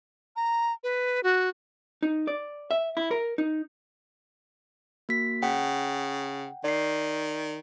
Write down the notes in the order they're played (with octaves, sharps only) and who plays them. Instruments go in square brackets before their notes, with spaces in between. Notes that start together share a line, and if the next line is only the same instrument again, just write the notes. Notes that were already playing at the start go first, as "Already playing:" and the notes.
[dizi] A#5
B4
F#4
[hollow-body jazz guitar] D#4
D5
E5
E4
A#4
D#4
[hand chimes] A#3 F#4 B6
[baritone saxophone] C#3 [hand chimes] F#5 G5
[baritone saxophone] D#3 [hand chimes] D5 C7